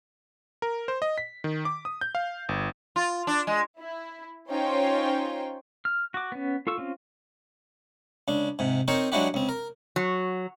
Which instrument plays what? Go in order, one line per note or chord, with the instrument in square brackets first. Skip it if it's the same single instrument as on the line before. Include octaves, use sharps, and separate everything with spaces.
[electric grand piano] A#4
C5
D#5
B6
D#3
D6
D#6
G6
F5
G1
[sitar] F4
D4
G#3
[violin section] E4
C#4 D#4 F4 C5 C#5 G5
[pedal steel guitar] F6
F#4 D6
B3 C#4
F4 A4 C#6 E6
C4 C#4 F4
[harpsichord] C#2 D4
G#2 C3
C4 D#4 A#4 C5 C#5
F#3 G#3 D4 E4 F#4 G4
C#2 C4
A#4
[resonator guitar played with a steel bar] F#3